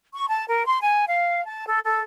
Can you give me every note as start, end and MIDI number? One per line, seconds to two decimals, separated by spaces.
0.14 0.25 85
0.29 0.44 81
0.48 0.66 70
0.67 0.78 84
0.82 1.06 80
1.08 1.43 77
1.47 1.65 81
1.67 1.79 69
1.84 2.01 69